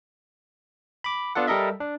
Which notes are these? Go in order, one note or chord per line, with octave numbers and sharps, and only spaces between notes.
B5 D6
B3 D4 F4 A4 F#5
G3 A4 A#4 D#5 E5
D4